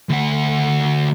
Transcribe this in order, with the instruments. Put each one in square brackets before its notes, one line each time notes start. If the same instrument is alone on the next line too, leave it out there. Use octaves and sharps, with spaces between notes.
[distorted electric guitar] D2 F#5